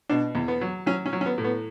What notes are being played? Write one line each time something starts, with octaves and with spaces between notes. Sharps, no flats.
B2 D4
E2
B3
F#3
F#3 C#4
C#4
F#3
C#4
B3
A2
B3